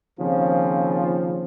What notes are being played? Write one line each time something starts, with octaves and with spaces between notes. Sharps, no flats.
D#2 C#3 F3 C4